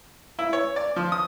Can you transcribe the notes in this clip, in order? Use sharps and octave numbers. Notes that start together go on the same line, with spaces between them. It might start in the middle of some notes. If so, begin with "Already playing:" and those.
E4
C#5
D5
F3
D#6